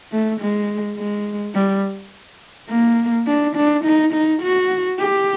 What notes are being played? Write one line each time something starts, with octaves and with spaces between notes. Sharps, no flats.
A3
G#3
G#3
G3
A#3
D4
D4
D#4
D#4
F#4
G4